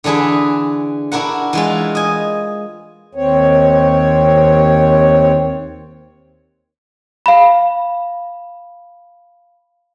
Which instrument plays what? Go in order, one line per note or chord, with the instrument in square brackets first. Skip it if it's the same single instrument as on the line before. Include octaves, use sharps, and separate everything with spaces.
[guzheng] D3 E3 D4 G#4 B4
D4 E4 F#4 A#4 F#5
E3 G#3 F4
D#5 G#5
[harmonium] D#2 C4 C#5
[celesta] F5 B5